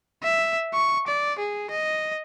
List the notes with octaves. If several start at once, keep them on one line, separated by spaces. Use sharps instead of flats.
E5
C#6
D5
G#4
D#5